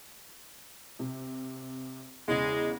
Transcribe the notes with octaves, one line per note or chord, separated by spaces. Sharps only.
C3
E2 C#3 G#3